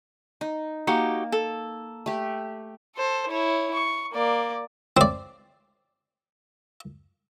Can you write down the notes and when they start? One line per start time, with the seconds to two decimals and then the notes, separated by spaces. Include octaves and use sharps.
0.41 D#4
0.87 A#3 D#4 F#4 G4
1.32 A4
2.06 A3 G4
2.96 A4 C5
3.28 E4 C#5
3.75 C#6
4.13 A#3 D5
4.97 C4 D5